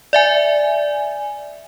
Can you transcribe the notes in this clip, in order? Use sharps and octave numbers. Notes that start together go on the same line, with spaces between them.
D5 E5 G#5